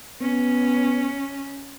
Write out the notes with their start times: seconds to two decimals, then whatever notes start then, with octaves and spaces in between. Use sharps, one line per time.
0.22 B3 C#4